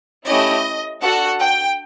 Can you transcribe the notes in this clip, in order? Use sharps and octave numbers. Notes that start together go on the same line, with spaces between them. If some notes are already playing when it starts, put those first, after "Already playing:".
A3 C#4 E4 G4 D#5
D4 F#4 A4 F#5
G5